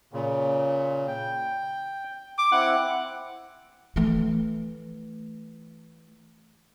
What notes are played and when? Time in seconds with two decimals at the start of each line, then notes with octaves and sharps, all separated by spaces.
0.13 A#2 C#3
1.07 G5
2.38 D6
2.52 C4 E4 F#5
3.96 E3 A3